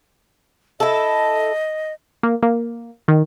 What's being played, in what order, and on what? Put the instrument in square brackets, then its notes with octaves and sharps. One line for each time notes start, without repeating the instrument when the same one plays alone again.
[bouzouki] E4 A4 [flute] D#5
[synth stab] A#3
A#3
D#3